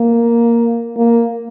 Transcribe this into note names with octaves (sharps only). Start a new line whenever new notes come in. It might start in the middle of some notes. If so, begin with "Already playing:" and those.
Already playing: A#3
A#3